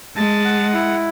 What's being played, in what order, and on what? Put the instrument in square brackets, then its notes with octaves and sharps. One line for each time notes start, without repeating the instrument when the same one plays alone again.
[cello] G#3 [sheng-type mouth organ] A5
[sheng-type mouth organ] F#5
E4